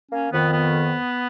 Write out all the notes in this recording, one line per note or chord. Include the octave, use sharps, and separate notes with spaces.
A#3 C#4
F2 D#3 B3
B3